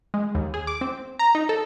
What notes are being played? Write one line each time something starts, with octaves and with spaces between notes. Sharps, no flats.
G#3
D#2
G#4
D6
C4
A#5
D#4
A4